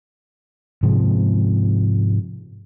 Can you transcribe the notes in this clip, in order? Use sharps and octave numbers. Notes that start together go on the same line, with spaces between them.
G#2 C3 F3 G#3